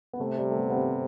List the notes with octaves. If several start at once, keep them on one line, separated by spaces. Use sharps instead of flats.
B3
C3 A3
G3
A3
B3
B3
C4